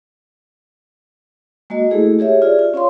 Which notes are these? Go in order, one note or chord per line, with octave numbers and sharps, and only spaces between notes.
G#3 A#3 F#4 D#5
A3 E4 G#4 A4
G4 G#4 C#5 E5
F4 G#4 D5
F4
C#4 C#5 F5 C6